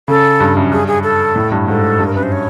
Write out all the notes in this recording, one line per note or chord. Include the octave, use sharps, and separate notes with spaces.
C#3 A4
G2
F#2
G2 G#4
G#4
A4
A2
G2
G#2 A4
G2
A#4
F#2 B4
C5
C#5